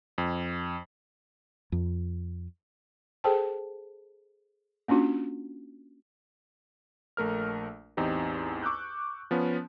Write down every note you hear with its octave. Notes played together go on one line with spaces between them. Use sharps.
F2
F2
G#4 A4 C5 G5 A5
A#3 C#4 D4 F4 F#4
A#1 A3 A#4 F6
A1 E2 C4 D#4 G4
C#6 D6 E6 F#6 G6
F3 B3 C#4